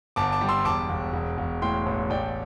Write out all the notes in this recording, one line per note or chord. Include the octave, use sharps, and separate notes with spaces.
G1 A5 D6
A5 D6
G3
C6 E6
E1 A5 D6
E1
E1
E1
A2 G5 C6
A1
A1 D5 G5